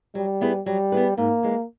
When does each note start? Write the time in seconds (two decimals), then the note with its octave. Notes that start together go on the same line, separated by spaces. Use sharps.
0.15 F#3 G3
0.41 B3 E4 G#4 B4
0.66 F#3 G3
0.92 B3 E4 G#4 B4
1.17 G#2 A#3
1.43 E3 G#3